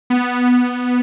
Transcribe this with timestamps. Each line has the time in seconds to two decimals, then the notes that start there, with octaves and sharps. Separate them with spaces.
0.10 B3